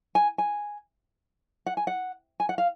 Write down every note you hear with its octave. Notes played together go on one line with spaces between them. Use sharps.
G#5
G#5
F#5
G#5
F#5
G#5
F#5
F5